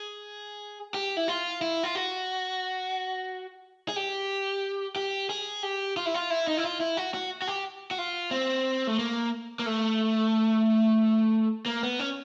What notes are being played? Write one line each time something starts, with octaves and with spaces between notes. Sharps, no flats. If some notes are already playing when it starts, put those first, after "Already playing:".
Already playing: G#4
G4
E4
F4
E4
F4
F#4
G#4
G4
G4
G#4
G4
F4
E4
F4
E4
D#4
E4
F4
E4
F#4
F#4
F#4
G4
F#4
F4
C4
A3
A#3
A#3
A3
A#3
B3
C#4